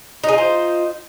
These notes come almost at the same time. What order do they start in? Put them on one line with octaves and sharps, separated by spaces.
D#4 G#4 F4 C5